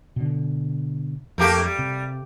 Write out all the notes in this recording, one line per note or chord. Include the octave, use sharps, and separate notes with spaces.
B2 D3
F2 A3 A#3 G4
G3
C3